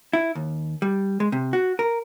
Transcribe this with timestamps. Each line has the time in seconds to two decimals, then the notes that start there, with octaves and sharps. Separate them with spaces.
0.13 E4
0.35 D#2
0.82 G3
1.20 G#3
1.32 C3
1.53 F#4
1.79 A#4